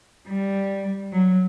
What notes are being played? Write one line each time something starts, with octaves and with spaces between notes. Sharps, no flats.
G3
F#3